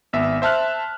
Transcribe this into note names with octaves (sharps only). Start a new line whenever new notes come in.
G#1 B3 E5
C5 E5 A5 F6 F#6